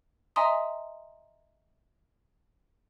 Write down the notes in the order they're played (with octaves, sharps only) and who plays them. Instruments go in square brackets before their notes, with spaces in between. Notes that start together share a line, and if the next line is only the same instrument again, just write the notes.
[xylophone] D#5 E5 G#5 A#5 C6 D#6